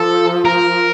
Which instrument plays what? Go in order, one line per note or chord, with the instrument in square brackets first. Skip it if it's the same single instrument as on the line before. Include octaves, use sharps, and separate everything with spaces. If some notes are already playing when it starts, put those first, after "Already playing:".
Already playing: [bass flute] F3 [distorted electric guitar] A4
[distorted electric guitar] A#4